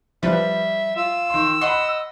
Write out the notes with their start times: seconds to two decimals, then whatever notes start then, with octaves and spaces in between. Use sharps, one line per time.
0.23 F3 G3 B4 E5
0.96 F4 E6
1.30 D#3 C6
1.61 D#5 F#5 B5 C6